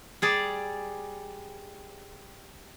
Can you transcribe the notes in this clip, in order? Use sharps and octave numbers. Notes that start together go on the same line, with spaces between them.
G3 G#4 D5